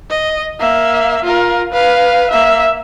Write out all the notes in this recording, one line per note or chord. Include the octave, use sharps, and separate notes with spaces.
D#5
A#3 E5
F4 A#4
B4 F5
A#3 E5